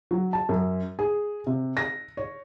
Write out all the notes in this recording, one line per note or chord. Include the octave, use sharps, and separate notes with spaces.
F#3
A5
F#2
G#4
C3
A#6
C#5